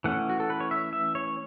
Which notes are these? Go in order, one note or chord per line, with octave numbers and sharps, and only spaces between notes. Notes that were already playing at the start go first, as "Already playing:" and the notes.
E3 A3 C#4 F#5
F#4
A4
B4
C#5
E5
E5
C#5